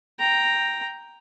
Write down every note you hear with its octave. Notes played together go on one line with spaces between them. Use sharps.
G5 A#5